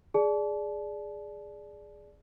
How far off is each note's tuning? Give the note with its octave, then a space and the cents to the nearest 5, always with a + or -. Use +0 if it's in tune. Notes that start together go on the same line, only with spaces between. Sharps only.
G#4 +0 D5 +0 A5 -35